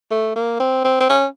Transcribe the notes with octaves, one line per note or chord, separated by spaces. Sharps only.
A3
A#3
C4
C4
C4
C#4